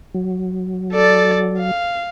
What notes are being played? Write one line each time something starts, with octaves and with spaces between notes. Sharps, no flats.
F#3
A4 D5
F5